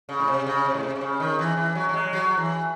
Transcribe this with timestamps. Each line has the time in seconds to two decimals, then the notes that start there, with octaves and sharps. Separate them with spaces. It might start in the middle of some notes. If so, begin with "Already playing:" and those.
0.09 C#3
0.19 A2
0.28 C3
0.47 C#3
0.65 C3
0.74 A2
0.83 C3
0.96 C3
1.01 C#3
1.20 D#3
1.39 E3
1.57 E3
1.75 F#3
1.89 F#3
1.94 G#3
2.13 F#3
2.37 E3